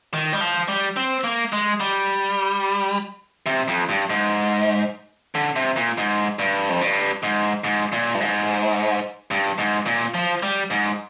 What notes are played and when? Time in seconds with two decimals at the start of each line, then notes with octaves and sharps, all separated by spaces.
0.14 D#3
0.33 G3
0.41 F3
0.68 G3
0.96 C4
1.24 A#3
1.53 G#3
1.80 G3
3.46 C3
3.68 F2
3.89 G2
4.10 G#2
5.35 D3
5.56 C3
5.76 A#2
5.98 G#2
6.39 G2
6.69 F2
6.81 G2
7.23 G#2
7.64 G#2
7.92 A#2
8.15 G2
8.20 G#2
9.31 G2
9.58 G#2
9.86 A#2
10.14 F3
10.43 G3
10.71 G#2